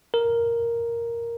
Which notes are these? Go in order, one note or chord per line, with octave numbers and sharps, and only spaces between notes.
A#4